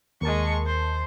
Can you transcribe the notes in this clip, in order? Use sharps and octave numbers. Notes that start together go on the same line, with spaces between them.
D#2 G#3 A#4 A5 C#6
C5